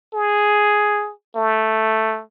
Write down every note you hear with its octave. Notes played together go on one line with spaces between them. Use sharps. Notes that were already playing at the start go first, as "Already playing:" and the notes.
G#4
A3